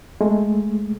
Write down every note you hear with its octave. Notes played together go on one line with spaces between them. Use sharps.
G#3 A3